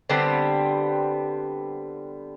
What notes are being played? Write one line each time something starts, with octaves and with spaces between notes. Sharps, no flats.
D3 G3 B3 C4